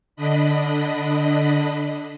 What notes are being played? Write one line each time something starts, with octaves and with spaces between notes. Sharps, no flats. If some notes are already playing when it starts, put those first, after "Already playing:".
D3 D4 D#5 B5